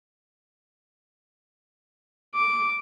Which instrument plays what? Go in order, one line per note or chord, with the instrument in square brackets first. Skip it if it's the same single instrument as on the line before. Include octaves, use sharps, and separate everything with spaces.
[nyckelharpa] D6